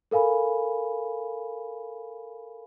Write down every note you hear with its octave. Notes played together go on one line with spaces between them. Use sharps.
A4 A#4 F5 G#5 B5